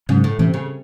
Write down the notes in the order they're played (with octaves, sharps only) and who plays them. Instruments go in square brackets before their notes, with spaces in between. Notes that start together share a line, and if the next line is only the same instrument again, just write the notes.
[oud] G#2 [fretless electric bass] C#3 F#3 C#4
[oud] A2
[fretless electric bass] A2 E3 A3 C#4 [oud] C3
[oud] C#3